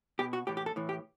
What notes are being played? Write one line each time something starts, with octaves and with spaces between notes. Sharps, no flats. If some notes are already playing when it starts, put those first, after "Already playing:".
B2 G4
F#4
A2 E3 G4
G4
A4
A2 E3
G4